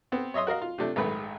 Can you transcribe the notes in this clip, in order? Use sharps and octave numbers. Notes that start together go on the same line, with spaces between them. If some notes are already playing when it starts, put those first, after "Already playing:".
B3 C4
C#5 D#5 E5 C6 D#6
F#4 A#4 D#5 F5
F4
C3 F3 A3 D4
A#1 G#2 D#3 A3 B4